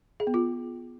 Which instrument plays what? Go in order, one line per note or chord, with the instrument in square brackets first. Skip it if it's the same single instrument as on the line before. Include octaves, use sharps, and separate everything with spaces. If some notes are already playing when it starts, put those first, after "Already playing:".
[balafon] G#4
B3
F4